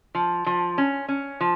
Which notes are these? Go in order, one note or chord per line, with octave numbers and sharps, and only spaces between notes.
F3
F3
C#4
C#4
F3